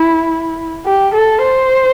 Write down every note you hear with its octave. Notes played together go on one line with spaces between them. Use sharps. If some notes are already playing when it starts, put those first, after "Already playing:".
Already playing: E4
G4
A4
C5